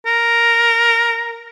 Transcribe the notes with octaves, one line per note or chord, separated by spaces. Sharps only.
A#4